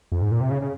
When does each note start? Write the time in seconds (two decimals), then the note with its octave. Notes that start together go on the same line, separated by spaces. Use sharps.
0.12 F2
0.22 G#2
0.32 A#2
0.41 C3
0.51 C#3
0.62 C#3